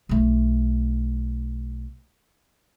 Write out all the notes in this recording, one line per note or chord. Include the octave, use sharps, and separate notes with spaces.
B1 A3